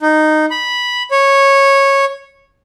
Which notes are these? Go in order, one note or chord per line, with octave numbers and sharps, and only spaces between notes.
D#4
B5
C#5